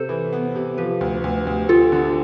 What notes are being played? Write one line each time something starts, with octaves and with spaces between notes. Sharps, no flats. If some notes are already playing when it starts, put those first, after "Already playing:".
Already playing: C3 A4 C5
E3
B3
C3
F3 G4 B4
D2
D2
D2
F4 G4 A4
D3